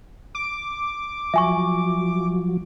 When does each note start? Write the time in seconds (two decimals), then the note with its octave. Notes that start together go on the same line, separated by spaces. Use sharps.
0.35 D6
1.34 F3 F#3 E5 G#5 C#6